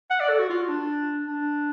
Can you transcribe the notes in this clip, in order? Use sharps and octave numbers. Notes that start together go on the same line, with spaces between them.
F#5
D5
A4
F#4
F4
D4
D4